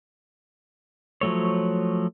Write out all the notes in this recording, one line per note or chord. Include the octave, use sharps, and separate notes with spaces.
F3 F#3 A3 C#5